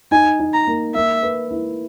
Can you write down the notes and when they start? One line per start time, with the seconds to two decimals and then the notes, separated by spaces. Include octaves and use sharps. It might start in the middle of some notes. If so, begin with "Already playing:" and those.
0.11 D#4 G#5
0.39 D#4
0.54 A#5
0.67 A#3
0.95 A#3 E5
1.23 B4
1.51 E4